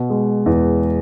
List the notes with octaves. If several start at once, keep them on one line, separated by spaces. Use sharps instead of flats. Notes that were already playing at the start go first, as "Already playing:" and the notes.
Already playing: B2
G#3
E2